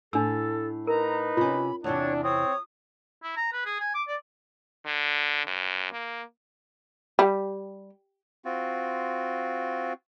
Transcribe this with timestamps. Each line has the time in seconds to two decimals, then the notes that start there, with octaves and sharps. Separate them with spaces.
0.13 A2 D4 A4 E6
0.87 D#4 A#4 B4 A#5
1.37 C3 C#4 F4 B5
1.84 E2 A2 C3 D4 C#5
2.23 C4 C#5 D#6
3.23 E4
3.37 A#5
3.53 B4
3.65 G#4
3.80 G#5
3.94 D6
4.08 D5
4.86 D3
5.46 F#2
5.92 A#3
7.19 G3
8.45 C4 F4 F#4